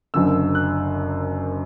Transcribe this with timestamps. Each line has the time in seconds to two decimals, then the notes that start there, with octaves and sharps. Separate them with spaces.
0.14 F#1 F#2 D3 E6
0.55 F#6